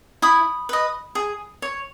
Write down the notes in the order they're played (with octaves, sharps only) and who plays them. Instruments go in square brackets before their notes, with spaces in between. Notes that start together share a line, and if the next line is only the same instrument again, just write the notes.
[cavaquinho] E4 B5 D#6
B4 D#5
G#4
C#5